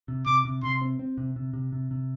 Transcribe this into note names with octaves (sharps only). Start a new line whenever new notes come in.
C3
C3 D6
C3
C3 C6
C4
C4
C3
C3
C3
C3
C3